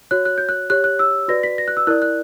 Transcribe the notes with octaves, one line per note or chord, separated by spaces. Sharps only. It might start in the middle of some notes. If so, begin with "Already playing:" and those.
F#4 C#5 F#6
F#6
G6
F#6
G4 C#5 F#6
F#6
E6
F#4 B4 D5 A#6
B6
A#6
F#6
E6
E4 A#4 D5 F#6
F#6